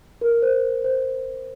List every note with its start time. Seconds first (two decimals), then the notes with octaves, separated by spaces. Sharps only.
0.21 A#4
0.42 C5
0.84 C5